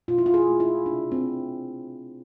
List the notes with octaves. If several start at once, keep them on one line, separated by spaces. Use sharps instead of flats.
B2 F4
E4
F4
G#4
A3
E4
C3 D4
C4